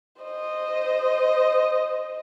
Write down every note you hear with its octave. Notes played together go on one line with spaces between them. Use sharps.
C5 D#5